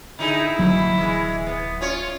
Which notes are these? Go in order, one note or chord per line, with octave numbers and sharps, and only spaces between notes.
D3 D#4 E4 G#4
D1 D#2 B2 F#3 A#3
E3 G#3
B3
C#4 F4 C#5